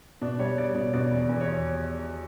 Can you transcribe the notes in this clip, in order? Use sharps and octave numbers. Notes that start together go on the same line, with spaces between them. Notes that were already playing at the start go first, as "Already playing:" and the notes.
B2 D4
G3 C#5
G3 D5
B2 C#5
B2 D5
E2
E2
C#5